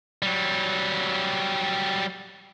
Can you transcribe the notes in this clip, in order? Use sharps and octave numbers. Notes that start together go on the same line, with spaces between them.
F#3 G3